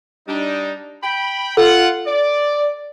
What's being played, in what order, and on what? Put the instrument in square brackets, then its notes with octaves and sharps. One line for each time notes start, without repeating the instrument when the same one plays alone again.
[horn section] G3 D4 D#4
G5 B5
[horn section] F4 F#5 [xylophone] A4
[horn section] D5